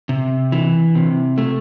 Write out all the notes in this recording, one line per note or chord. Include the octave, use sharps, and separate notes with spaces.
C3
E3
C3
A3